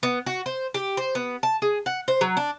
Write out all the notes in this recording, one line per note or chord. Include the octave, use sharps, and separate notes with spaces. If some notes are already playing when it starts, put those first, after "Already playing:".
B3
F#4
C5
G4
C5
B3
A5
G#4
F#5
C5
F#3
D4